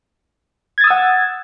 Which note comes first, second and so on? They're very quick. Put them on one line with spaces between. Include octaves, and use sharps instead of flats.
G#6 A6 D#6 E6 F#5